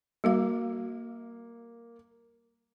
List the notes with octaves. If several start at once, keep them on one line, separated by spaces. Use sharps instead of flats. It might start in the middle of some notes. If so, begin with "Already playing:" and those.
G3 A#3 F#4 F5